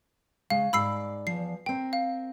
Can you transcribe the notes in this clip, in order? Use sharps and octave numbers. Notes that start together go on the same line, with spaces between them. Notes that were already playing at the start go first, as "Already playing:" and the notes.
C#3 G#3 F5
G#2 A4 D5 B5 E6 C7
E2 F3 C7
C4 A#4 G5
F5